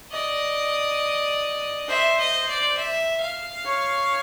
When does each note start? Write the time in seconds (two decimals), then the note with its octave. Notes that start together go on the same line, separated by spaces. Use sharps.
0.12 D5 D#5
1.89 C5 E5
2.18 D#5
2.33 C5
2.48 D5
2.77 E5
3.21 F5
3.66 C#5